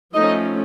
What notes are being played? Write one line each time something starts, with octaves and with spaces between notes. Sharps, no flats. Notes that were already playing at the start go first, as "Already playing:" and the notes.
F3 A3 C#4 D#4 D#5